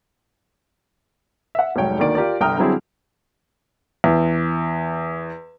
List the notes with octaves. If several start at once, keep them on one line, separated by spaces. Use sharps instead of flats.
E5 F#5
F1 C2 G#2 F#3 C#5 G5
D2 D#3 A#3 D5 D7
F4 G4 A#4 D5
G1 C2 G5 A#5 D#6 F6
D3 F#3 G3 C4 E4 G#4
E2